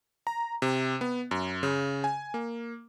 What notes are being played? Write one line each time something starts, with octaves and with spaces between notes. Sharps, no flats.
A#5
C3
B3
F#2
C#3
G#5
A#3